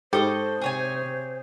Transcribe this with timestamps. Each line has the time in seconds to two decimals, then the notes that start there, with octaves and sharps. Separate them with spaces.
0.13 G#2 G4 A4 C5 D#5 C#6
0.61 C3 G#4 C#5 G#5